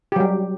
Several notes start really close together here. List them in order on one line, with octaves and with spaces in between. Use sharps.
G4 F#3 G3